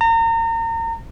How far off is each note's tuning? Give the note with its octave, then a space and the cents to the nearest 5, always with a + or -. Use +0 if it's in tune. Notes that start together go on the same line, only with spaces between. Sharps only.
A#5 -35